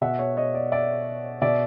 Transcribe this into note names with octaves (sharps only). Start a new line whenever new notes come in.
B2 E5 F#5
C#5
C#5 D#5
D5
D5 E5
B2 D5 E5